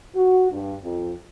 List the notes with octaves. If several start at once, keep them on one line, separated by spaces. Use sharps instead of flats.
F#4
G2
F2